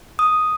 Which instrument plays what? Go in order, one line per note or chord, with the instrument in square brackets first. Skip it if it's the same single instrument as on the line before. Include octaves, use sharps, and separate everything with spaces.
[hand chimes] D#6